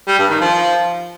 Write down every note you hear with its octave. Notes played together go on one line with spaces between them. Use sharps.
G3
G2
D#3
F3